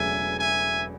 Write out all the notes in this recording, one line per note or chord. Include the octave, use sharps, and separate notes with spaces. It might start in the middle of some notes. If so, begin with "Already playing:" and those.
Already playing: E1 E2 C#3 F#3 A3 E5 G#5
E5 G#5